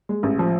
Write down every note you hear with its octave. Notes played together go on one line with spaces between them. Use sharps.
G#3
A1
F3